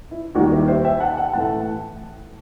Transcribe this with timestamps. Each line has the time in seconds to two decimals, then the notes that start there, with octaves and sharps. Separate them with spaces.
0.11 E4
0.35 D#2 D#3 G3 D#4 F#4
0.52 E4 G4
0.68 C5 E5
0.85 E5 G5
1.00 F#5 A5
1.17 F#5 A5
1.33 A2 E3 A3 F#5 A5